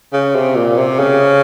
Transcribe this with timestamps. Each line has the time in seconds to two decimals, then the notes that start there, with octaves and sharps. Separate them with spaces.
0.13 C#3
0.35 C3
0.55 A#2
0.77 C3
0.99 C#3